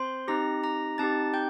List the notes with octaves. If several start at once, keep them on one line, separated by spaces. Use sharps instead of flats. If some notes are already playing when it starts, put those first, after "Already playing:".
Already playing: C4 C5 C6
C4 D#4 G4 A#5 A#6
A#5 A#6
C4 D#4 G4 A5 A6
G5 G6